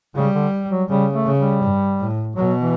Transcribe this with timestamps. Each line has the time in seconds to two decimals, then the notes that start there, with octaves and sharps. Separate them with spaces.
0.15 C#3 G3
0.34 D3
0.71 F#3
0.88 C#3 G3
1.13 A3
1.26 C#3
1.38 G3
1.63 G2
1.99 A2
2.36 B2 F#3
2.61 E3